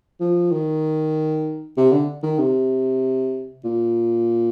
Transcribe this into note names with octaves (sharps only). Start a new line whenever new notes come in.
F3
D#3
C3
D3
D#3
C3
A#2